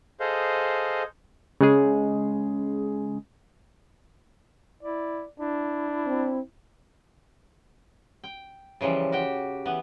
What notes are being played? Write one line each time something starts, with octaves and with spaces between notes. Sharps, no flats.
G#4 A4 C5 D#5 F5
C#3 G#3 G#4
E4 D5
D4 E4
C4
G5
C#3 E3 F3 G3
F#4 G4 G5
E3 B3